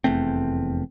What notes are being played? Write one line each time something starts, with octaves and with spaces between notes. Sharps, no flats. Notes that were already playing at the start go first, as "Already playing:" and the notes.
F1 E2 A3 C4